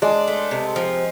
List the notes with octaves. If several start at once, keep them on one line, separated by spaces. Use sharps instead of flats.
G#3 D4
A3
C3
F3